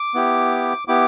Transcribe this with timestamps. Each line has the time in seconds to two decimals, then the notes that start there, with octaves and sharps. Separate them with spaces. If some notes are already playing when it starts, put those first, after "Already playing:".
Already playing: D6
0.14 B3 E4 G4
0.88 B3 E4 G4 D6